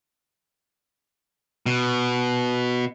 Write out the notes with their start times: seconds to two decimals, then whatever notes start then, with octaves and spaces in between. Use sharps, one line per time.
1.66 B2